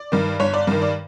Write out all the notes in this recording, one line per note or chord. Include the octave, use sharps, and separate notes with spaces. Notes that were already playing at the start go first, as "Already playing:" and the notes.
Already playing: D5
G2 D#3
G1 C#5
D5
G2 D#3
D5